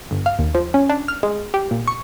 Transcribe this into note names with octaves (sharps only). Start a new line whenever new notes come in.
G1
F5
D#2
F3
C#4
D4
F6
G#3
G4
A#2
C#6